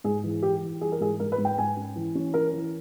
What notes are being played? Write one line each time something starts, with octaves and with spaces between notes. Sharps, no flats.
G#2 G#4
E3
E3 G4
E3
G3 G#4
A#4
G#2 G#4
G#2 A#4
B4
G#2
G5
G#2 G#5
C#4
E3
C#4
C#4 A#4
E3